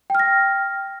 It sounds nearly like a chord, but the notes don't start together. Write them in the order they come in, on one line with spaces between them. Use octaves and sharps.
G5 F6 A#6